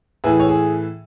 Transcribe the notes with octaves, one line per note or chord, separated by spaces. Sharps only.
A2 E3 G#4 B4
C#5
G#4